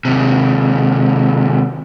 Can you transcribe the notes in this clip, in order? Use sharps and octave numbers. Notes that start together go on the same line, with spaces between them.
D#2 C3